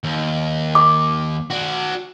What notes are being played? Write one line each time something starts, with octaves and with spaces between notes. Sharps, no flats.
D#2
D6
F#4 D5